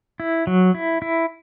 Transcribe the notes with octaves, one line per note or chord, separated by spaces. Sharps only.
E4
F#3
E4
E4